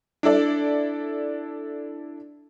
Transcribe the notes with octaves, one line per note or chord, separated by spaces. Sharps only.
D4 E4 A4 D5